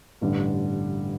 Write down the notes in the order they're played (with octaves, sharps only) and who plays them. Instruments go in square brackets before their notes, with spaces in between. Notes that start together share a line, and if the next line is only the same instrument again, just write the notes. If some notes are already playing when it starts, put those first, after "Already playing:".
[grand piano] A1 G2 D3